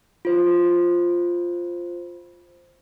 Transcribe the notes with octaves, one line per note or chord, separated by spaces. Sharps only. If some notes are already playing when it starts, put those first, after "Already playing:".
F4 C5